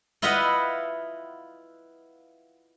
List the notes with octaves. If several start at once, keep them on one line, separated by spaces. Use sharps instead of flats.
E4 F4 B4 D#5 E5 F#5